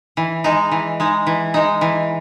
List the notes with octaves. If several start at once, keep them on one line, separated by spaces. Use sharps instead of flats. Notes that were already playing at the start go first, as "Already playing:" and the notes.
E3
G#3 D#4
E3
G#3 D#4
E3
G#3 D#4
E3